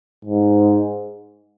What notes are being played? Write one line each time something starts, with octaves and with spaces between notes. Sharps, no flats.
G#2